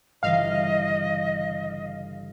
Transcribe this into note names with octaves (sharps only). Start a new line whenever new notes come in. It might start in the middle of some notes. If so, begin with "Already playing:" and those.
G1 C#3 E3 D#5 F5